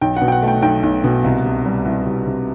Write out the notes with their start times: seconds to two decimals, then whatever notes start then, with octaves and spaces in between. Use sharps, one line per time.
0.01 B1 G5
0.17 F#5
0.22 B2
0.28 G5
0.32 F#5
0.42 A3
0.48 G5
0.62 B1 G5
0.83 B1
1.04 B2
1.24 C2
1.45 C3
1.66 G3
1.85 C2
2.06 C2
2.27 C3